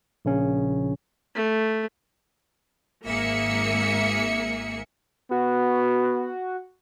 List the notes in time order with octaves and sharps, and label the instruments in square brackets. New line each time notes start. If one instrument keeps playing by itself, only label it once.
[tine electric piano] A#1 C#3 C#4
[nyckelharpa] A3
[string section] G#1 A#3 G#4 E5 C#7
[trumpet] B3 [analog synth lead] F#4